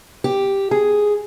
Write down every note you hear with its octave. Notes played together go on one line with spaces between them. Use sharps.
G4
G#4